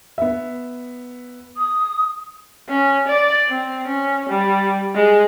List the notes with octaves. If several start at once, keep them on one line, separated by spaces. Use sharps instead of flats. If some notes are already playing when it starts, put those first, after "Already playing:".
B3 E5
D#6
C#4
D5
C4
C#4
G3
G#3